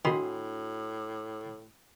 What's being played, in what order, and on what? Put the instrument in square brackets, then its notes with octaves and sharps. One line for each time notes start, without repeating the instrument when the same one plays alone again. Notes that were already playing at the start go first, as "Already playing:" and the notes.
[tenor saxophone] A2 [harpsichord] D#3 [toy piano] D4 F#4 F#5 [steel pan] B5 C6 D#6